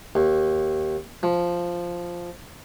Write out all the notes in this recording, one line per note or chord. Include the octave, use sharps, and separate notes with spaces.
D#2
F3